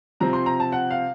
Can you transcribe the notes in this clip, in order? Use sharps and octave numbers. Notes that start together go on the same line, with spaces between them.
C3 F3 C4 A#5
C6
A#5
A5
F#5
F5